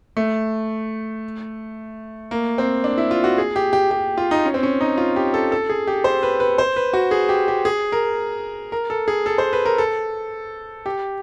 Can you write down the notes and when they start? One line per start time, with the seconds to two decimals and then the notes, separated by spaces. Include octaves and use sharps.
0.17 A3
2.31 A#3
2.58 C4
2.84 D4
2.98 E4
3.11 F4
3.24 F#4
3.38 G#4
3.56 G4
3.73 G4
3.91 G4
4.18 F4
4.31 D#4
4.45 C#4
4.54 C4
4.63 C#4
4.81 D#4
4.98 F4
5.16 G4
5.34 A4
5.52 A4
5.69 G#4
5.87 G4
6.04 C5
6.23 B4
6.40 B4
6.58 C5
6.76 B4
6.93 F#4
7.11 G#4
7.29 G4
7.48 G4
7.65 G#4
7.92 A#4
8.72 A#4
8.90 A4
9.08 G#4
9.26 A4
9.38 C5
9.53 B4
9.66 A#4
9.78 A4
10.86 G4